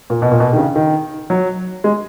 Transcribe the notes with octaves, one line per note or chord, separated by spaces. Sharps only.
A#2
B2
A#2
B2
D#3
C#3
D#3
F#3
G#3